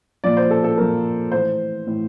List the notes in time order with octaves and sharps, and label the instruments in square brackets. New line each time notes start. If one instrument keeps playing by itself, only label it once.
[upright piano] A#2 F3 D5
C5
A4
A4
A#2 F3 A#4
A2 E3 C5
A2 E3